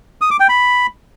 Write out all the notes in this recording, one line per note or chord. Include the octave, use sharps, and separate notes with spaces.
D#6
D6
G5
B5